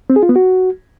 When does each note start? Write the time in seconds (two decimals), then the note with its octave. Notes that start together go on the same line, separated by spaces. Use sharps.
0.10 C4
0.16 G#4
0.23 F4
0.29 B3
0.36 F#4